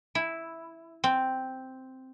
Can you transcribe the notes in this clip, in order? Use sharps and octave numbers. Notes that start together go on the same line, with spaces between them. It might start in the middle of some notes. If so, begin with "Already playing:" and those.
E4
C4